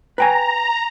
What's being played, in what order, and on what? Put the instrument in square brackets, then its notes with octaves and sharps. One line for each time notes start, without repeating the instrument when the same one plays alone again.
[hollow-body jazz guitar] B4 G5 G#5 [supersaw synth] A#5